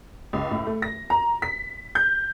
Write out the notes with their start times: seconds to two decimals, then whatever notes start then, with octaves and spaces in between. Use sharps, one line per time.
0.33 C#2
0.51 A2
0.67 A3
0.82 A#6
1.10 A#5
1.42 B6
1.95 G6